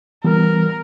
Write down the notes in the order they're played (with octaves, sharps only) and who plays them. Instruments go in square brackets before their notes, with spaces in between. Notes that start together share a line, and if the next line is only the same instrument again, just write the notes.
[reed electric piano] E3 G3 B3 [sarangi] A#4